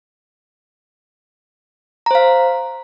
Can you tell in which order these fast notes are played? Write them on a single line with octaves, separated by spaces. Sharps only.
A#5 C5 F5